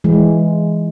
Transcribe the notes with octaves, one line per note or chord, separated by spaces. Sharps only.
E3 G#3